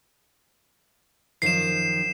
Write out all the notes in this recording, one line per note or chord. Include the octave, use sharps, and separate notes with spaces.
F#2 D#3 F3 C7 E7